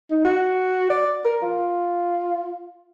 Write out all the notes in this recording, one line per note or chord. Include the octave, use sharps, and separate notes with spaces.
D#4
F#4
D5
A#4
F4